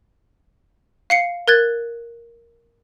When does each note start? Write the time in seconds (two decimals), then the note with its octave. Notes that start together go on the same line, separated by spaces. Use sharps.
1.10 F5 C7 C#7
1.48 A#4 F#6 G#6 A6